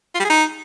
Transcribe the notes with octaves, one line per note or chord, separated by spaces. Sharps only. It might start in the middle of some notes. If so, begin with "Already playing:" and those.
F4
G3
G#4
D#4